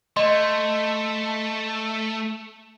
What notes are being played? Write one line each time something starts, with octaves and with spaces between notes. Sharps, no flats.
A3 D#5 C6